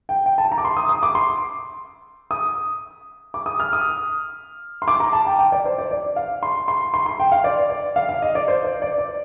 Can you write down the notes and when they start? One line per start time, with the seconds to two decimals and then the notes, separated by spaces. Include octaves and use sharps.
0.09 G5
0.26 G5
0.38 A5
0.52 A#5
0.58 D6
0.65 C6
0.77 D#6
0.89 D#6
1.03 D6
1.15 C6
2.31 D#6
3.34 D6
3.46 D#6
3.60 F6
3.73 D#6
4.82 C6
4.88 D6
5.00 A#5
5.13 A5
5.27 G5
5.39 G5
5.52 D5
5.65 C5
5.78 D5
5.91 D5
6.16 F5
6.43 C6
6.68 C6
6.94 C6
7.06 C6
7.20 G5
7.32 F5
7.44 D5
7.70 D5
7.96 F5
8.09 F5
8.22 D#5
8.35 D5
8.48 C5
8.65 D5
8.82 D5
8.98 D5